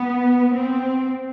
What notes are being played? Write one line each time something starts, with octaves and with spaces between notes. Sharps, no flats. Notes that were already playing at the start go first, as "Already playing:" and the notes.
Already playing: B3
C4